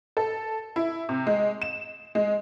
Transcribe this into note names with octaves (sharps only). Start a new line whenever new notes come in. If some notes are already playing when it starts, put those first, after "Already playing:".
A4
E4
C3
G#3
E7
G#3